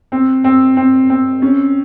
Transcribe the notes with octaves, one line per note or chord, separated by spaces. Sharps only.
C4
C4
C4
C4
C#4